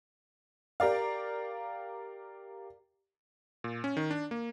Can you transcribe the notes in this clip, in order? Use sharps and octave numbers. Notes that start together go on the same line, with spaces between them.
G4 A#4 D5 F5
A#2
C#4
D#3
D4
A#3